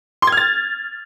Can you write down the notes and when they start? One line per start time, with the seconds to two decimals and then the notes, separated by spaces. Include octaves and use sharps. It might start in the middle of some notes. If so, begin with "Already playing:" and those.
0.22 C6
0.27 G#6
0.32 F6
0.37 A6